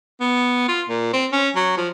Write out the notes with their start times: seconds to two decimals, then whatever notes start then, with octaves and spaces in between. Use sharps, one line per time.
0.20 B3
0.68 F4
0.89 A#2
1.13 C4
1.32 C#4
1.55 F#3
1.77 F3